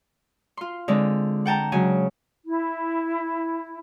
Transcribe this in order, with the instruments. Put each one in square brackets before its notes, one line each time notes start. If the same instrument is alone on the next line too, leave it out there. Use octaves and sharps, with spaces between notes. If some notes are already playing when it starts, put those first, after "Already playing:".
[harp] F4 C6
D3 G#3 C4
F#5 G5 A5 A#5
C#3 F#3 G#3 G#5
[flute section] E4